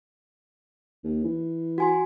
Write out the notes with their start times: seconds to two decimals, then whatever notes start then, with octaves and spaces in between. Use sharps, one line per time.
1.04 D#2
1.24 E3
1.78 F#4 G#5 C6